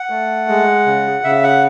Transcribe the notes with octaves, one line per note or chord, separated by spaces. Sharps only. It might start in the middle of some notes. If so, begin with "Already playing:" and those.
Already playing: F#5
A3
G#3
C#3
C#3 E5
F#5